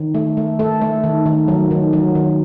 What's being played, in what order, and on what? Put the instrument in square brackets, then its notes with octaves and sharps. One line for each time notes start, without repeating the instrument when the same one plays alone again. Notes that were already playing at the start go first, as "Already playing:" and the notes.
Already playing: [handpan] D#3
A3
A3
A3 A4
A3
D#3
D#3
F#3
D#3
F#3
D#3